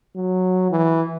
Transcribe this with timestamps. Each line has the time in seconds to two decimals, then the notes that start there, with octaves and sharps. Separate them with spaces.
0.16 F#3
0.71 E3